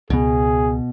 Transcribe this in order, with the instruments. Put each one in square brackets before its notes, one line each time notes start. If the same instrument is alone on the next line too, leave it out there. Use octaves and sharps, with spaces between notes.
[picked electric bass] C#2 B3 [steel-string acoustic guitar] B2 [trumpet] G#4